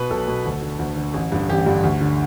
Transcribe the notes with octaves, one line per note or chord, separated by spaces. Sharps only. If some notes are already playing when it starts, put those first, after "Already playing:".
Already playing: B2 B4
B1 A4
B2
D2
D3
D2
D3
A1
G2 D3
A1 G4
G2 D3
D2
D3